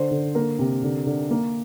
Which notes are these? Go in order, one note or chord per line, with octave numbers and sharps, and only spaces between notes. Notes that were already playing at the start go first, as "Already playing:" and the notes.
Already playing: D3 C5
D3
A#3 A#4
C3
D3
D3
A#3